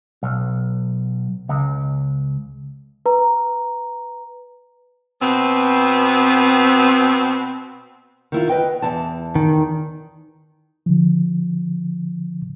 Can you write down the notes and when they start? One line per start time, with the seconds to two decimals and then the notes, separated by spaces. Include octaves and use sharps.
0.23 B1
1.49 C#2
3.06 B4 A#5
5.20 B2 B3 C4
8.32 D#3 E4 F4
8.49 B4 D#5 G5
8.82 E2 E3 A5
9.35 D#3
10.86 D3 F3